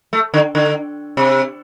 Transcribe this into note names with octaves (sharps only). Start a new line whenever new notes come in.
A3
D3
D3
C3